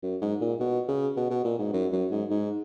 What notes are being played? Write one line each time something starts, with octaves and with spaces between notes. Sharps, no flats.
F#2
G#2
A#2
B2
C#3
B2
B2
A#2
G#2
F#2
F#2
G#2
G#2